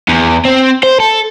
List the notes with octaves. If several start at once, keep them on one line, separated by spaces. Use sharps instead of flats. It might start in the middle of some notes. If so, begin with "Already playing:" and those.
E2
C4
C5
A4